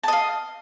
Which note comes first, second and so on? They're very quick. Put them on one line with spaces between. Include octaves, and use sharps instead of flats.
A5 D#5 F5